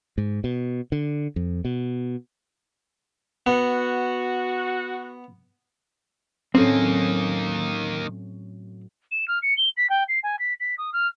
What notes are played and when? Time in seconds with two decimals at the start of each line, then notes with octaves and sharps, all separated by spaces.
0.18 G#2
0.44 B2
0.92 D3
1.36 F2
1.65 B2
3.46 B3 F#4
6.55 A2 D#3 F#3 A#3 C4 C#4 A4
9.11 E7
9.27 F6
9.42 C#7
9.57 G7
9.76 B6
9.89 G5
10.08 C7
10.23 G#5
10.39 B6
10.60 B6
10.77 D#6
10.93 F6